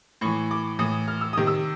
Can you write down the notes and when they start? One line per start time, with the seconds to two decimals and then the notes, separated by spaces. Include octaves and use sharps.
0.21 A2 E3 C#6
0.51 D6
0.79 A2 E3 D#6
1.08 F6
1.21 E6
1.33 C3 D#3 D#6
1.47 E6